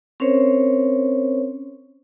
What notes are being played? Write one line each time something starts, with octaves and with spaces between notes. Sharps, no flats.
C4 C#4 A#4 C5 C#5